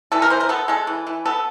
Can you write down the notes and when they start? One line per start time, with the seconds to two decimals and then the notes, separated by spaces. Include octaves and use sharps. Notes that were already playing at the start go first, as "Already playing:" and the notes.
0.12 E3 A4
0.22 A#4
0.30 E3 C5
0.40 A#4
0.49 B3 A4
0.68 G#3 A4
0.87 E3
1.07 E3
1.25 B3 A4